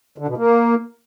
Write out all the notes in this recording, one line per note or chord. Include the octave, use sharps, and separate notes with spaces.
D3
B2
A#3